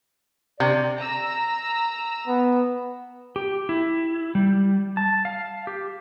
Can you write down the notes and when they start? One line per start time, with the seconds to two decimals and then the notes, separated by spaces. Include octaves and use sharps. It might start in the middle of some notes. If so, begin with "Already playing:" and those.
0.60 C3 D5
0.98 A#5 E6
2.27 B3
3.36 G4
3.69 E4
4.35 G3
4.97 A5
5.25 F5
5.67 G4